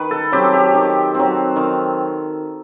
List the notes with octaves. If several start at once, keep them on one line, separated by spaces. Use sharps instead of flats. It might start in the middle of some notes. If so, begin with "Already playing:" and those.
Already playing: D#3 B4
A4
F#3 C4 G4
G4
D#3
F#3 C4
D#3